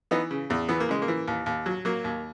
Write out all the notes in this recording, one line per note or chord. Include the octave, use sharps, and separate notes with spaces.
E3 B3 D#4
C#3
E2
E3 B3
A#3
C#3 G#3
A#3
E3
D#2
D#2
F#3
F#3 A#3
D#2